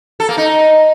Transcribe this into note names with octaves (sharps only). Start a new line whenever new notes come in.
A4
A#3
D#4